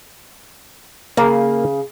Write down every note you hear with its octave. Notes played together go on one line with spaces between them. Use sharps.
C#3 A#3